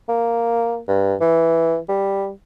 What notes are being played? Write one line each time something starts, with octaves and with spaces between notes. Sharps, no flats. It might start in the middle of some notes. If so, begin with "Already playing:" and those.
A#3
G2
E3
G3